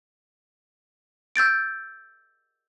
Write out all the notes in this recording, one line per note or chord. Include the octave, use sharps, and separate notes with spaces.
E6 G6 A6 D7